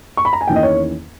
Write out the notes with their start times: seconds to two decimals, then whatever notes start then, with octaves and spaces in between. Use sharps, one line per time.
0.17 C#6
0.25 B5
0.33 A#5
0.41 G#5
0.48 E2 D#3 A#3 C#4 E4 G5
0.56 D#5
0.63 C#5